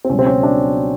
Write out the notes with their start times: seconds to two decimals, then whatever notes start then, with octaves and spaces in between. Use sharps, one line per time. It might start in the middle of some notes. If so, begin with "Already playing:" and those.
0.05 C4
0.10 C#2 B2 F#3 C#4
0.19 C4
0.26 C#4
0.43 D4